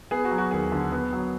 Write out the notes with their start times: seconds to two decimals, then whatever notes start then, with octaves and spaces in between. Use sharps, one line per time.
0.11 B3 G#4
0.25 F#4
0.31 F#3
0.38 F#4
0.51 D#2 G#4
0.72 D3
0.92 B3
1.13 F#3